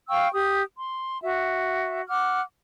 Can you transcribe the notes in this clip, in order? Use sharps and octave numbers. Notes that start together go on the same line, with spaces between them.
F5 G5 C#6 E6
G4 D#6
C6
F#4 E5
F#5 D6 F6